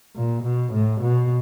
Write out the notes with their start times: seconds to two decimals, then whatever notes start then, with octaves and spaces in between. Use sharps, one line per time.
0.16 A#2
0.44 B2
0.73 A2
1.01 B2